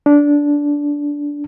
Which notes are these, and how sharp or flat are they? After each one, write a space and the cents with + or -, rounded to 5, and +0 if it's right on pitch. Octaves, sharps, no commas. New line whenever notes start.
D4 -15